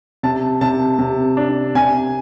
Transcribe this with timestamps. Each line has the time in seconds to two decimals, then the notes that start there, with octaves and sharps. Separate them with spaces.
0.23 C3 A5
0.61 C3 A5
0.99 C3
1.37 D4
1.75 C3 G#5